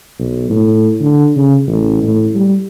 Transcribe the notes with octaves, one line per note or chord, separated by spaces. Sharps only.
B1
A2
D3
C#3
A1
A2
G3